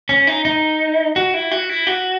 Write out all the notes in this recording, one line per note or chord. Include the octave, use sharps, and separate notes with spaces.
C#4
D#4
D#4
F#4
E4
F#4
E4
F#4